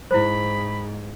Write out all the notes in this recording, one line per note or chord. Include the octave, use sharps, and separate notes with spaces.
G#2 E4 C5 B5